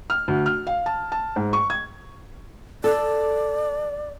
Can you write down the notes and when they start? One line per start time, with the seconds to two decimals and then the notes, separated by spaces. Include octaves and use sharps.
0.10 F6
0.28 D2
0.46 F6
0.67 F5
0.86 A5
1.12 A5
1.36 G#2
1.53 C#6
1.70 G#6
2.84 A4 D5